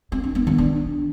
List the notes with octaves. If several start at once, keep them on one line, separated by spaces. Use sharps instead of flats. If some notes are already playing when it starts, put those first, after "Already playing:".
C4
D4
B3
D#3
D4